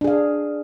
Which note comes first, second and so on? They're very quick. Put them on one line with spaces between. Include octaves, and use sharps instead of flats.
D4 G#4 F5